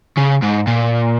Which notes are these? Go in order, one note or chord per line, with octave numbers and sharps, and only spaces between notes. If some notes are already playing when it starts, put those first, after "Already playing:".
C#3
G#2
A#2